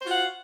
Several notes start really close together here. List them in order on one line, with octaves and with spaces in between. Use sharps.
C5 F#4 F4 F#5 F5